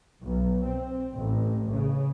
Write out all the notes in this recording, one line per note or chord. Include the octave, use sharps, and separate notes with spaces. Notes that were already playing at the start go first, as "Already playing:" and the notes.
B1
C4
A1
C#3